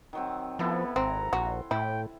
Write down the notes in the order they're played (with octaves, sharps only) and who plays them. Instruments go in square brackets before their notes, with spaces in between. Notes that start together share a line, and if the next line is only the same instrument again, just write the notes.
[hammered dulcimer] D#3 F#3 C4
[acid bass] F3 [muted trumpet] B3 [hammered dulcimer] E4 A4
[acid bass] G#1 [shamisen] C4 [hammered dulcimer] F#5 [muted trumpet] A#5
[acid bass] A#1 [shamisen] F#4 [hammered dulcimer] C6
[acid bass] A2 [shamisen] E4 [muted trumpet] G5